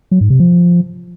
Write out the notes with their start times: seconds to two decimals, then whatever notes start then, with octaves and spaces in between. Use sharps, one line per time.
0.11 F#3
0.21 G#2
0.30 C3
0.40 F3